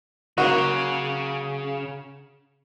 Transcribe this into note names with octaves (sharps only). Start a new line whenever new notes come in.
C#3 F#3 A#3 F#4